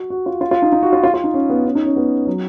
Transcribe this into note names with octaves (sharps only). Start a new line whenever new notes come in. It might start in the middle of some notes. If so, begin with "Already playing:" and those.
Already playing: F#4
F#4
F4
F4
F4
D#4
D#4
F#4
F4
F4
F4
D#4
C#4
B3
C#4
D#4
C#4
B3
F#3